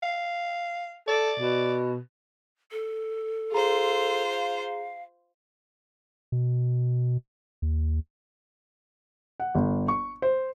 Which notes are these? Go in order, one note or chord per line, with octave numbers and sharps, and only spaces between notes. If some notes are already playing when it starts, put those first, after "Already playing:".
F5
A4 D5
B2
A4
F4 G#4 C5 A#5
F5
B2
D#2
F#5
G1
C#6
C5